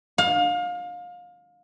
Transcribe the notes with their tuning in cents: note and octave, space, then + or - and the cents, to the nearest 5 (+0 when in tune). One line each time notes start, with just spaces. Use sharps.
F5 +30